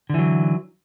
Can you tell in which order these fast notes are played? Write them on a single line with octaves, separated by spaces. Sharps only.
D3 E3 F#3